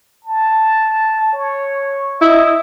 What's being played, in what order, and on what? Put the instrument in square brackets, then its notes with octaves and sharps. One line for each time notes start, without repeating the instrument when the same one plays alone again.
[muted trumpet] A5
C#5
[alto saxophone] E4 [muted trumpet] D#5